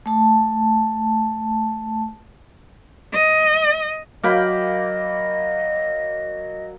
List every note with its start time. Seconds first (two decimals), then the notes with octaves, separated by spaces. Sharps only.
0.06 A3 A5
3.14 D#5
4.24 F#3 A#3 D#5 G5 B5